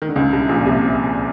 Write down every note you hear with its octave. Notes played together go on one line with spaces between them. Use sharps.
D#3
D3
C#2 C#3
C2 C3
A#1 A#2
C2 C3